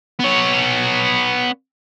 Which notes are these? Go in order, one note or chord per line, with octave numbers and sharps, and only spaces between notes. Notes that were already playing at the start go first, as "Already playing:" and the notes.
B3 C#5